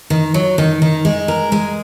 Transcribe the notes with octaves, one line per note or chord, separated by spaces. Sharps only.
D#3
F#3
D#3
D#3
G#3
A#4
G#3